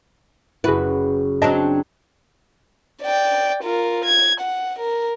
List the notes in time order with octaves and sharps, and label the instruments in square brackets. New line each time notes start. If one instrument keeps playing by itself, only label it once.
[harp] F#1 F#4 [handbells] E4 G#4 [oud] B4
[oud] F#3 C4 D4 [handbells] D#5 A5
[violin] D5 G5
F4 A#4
G#6
F#5
A#4